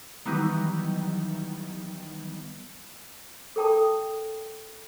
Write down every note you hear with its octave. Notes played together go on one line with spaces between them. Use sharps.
D#3 E3 F#3 G3 B3 D#4
A4 A#4 G5 A5 D#6